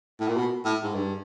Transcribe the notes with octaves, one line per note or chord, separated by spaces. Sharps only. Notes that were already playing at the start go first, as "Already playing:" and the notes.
A2
A#2
B2
A2
G#2
G2